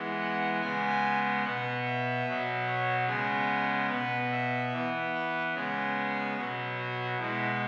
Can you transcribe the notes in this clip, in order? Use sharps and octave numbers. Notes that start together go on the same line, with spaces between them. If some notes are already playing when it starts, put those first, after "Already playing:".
Already playing: E3 G#3 B3
F#5
C#3 G#3 B3 G#5
B2 B3 F#5
E5
B2 F#3 B3
C#5
C#3 G#3 B3 G#4
B2 B3 B4
E5
E3 B3
B4
C#3 G#3 B3 G#4
B2 F#3 B3
F#4
B2 G#3 B3 E4